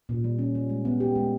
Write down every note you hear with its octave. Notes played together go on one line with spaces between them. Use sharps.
A#2
G3
C#4
G3
G#3
B3
G4
G#3